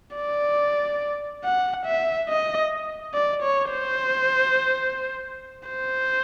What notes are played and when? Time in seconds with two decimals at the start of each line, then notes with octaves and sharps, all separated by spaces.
0.17 D5
1.44 F#5
1.86 E5
2.29 D#5
3.14 D5
3.42 C#5
3.71 C5
5.69 C5